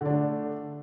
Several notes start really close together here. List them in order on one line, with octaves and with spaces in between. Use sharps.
D3 D4 A3